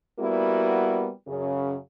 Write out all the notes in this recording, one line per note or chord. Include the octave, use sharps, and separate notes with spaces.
G3 A#3 B3 E4 F#4
F#2 C#3